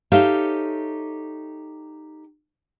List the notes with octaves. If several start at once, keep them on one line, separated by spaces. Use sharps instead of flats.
D#4 G4 A4 C#5 E5 F5